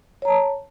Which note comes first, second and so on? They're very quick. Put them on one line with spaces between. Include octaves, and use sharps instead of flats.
C#5 A#5 A5